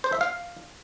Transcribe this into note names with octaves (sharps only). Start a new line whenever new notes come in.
C5
E5
F5